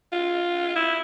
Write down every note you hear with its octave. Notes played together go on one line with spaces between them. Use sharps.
F4
E4